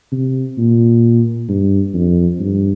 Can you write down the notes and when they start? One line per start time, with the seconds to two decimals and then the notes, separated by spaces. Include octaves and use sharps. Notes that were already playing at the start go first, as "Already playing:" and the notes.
0.12 C3
0.58 A#2
1.49 G2
1.94 F2
2.40 G2